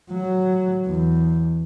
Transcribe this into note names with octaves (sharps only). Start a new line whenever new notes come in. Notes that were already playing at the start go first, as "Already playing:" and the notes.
F#3
E2